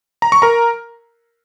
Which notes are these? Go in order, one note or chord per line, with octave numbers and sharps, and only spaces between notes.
A#5
C#6
A#4 A#5